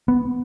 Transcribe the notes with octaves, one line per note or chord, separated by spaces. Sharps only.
B3